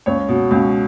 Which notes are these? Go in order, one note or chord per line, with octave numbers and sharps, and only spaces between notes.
C#2 C#5
B2
C#2